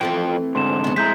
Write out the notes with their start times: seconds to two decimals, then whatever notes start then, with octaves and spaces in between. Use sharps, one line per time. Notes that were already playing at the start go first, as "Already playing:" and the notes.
0.01 F2 E3 A3 C4 F4 G5
0.55 G#2 D3 C6 E7
0.84 C#3 B3
0.96 G#3 A3 E4 A#5 G6 B6